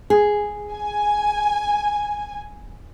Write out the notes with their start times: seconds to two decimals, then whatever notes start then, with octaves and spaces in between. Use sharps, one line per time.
0.10 G#4
0.72 G#5